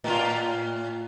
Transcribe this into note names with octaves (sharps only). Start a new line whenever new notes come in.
A2 F4